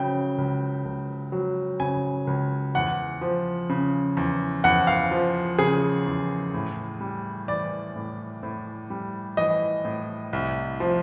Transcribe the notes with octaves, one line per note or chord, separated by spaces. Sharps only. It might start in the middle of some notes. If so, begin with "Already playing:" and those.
Already playing: C#3 F#3 G5
C#2
C#2
F#3
C#3 G#5
C#2
E2 F#5
F3
C#3
E2
E2 F#5
F5
F3
C#3 G#4
E2
A2
G3
E3 D5
A2
A2
G3
E3 D#5
A2
C2
F3